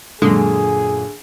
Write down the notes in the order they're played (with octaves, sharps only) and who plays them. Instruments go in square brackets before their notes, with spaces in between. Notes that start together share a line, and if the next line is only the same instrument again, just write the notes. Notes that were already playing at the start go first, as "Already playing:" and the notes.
[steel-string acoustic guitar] F#2 A#2 [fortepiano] D3 [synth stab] G#3 [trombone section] G#4